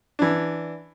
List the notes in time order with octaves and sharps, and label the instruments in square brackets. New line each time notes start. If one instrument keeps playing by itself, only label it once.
[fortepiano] E3 D4